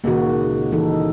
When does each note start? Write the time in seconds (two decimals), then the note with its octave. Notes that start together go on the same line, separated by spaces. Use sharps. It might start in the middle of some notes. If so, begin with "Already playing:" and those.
0.04 C#2 A#2 D#3 A#3 F#4
0.72 E3 D#4 A4